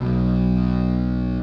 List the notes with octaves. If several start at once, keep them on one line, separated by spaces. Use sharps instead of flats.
B1 B2